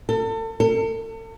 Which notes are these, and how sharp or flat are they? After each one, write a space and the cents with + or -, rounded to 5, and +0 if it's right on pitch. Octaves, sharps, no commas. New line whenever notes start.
A4 +35
A4 +40